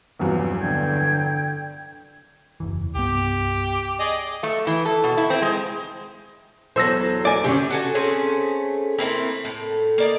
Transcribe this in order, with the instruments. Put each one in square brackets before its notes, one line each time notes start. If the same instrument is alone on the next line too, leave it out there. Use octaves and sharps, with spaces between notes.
[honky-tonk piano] F1 E2 F3 [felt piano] G2 F#3
[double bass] D3 [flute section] G5 G6 G#6
[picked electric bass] F#1 E2 E3
[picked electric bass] C2 G2 B3 [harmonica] G4
[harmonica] G#4 D5 D#5
[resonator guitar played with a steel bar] A3
E3
A4
B2
E4
C4
G#3
[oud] E2 F#3 A4 [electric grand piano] C5 E6 A#6
[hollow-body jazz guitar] D5 G#5
[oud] F#2 D3 [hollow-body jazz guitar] C#4 G4
[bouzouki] F#4 A4 G#5
A3 C4 C#4 G#4
A3 A#3 C4 E4
A2
A#3 D5 D#5